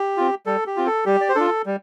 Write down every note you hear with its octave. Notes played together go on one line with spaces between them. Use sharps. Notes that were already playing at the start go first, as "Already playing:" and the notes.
Already playing: G4
C4 F4
G3 A4
G4
C4 F4
A4
G3 G4
D5
C5
D4 F4 A4
G3